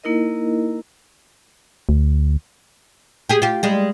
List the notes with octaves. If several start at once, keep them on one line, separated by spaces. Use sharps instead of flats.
A#3 D#4 E4 A#4 D#5
D2
G4 G#4
F4 G4
G3 G#3